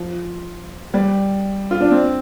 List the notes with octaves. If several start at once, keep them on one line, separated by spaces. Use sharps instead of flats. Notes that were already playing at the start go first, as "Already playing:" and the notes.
Already playing: F3
G3
F4
D4
C4